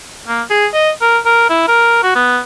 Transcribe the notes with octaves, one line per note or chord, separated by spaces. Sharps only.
A#3
G#4
D#5
A#4
A#4
E4
A#4
F#4
B3